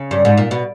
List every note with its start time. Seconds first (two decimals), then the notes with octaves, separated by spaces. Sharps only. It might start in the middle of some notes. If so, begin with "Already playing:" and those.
Already playing: C#3
0.11 G2
0.25 G#2
0.37 A#2
0.51 B2